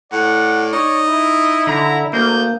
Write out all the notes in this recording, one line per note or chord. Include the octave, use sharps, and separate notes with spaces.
A2 D5 F#5
D#4 C#5
E4
D3 A#5
D2 A#3 G6